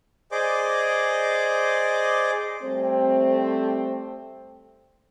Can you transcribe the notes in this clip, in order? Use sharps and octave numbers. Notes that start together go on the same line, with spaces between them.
G#4 C5 D5 D#5 D6
G3 A3 C4